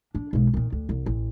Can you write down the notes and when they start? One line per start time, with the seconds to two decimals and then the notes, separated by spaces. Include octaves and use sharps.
0.15 D4
0.33 B1 G#3
0.54 A#2 D#3
0.72 D2
0.89 C2
1.06 A1